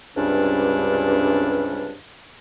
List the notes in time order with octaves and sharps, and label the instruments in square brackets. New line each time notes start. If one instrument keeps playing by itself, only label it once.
[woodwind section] C#2 G2 C3 G3 C#4 D4